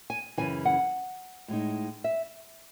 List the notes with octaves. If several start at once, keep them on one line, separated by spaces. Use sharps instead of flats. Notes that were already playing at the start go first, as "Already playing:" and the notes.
G#5
F#2 C#3 E3 G#5
F#5
A2 G#3 D#4
E5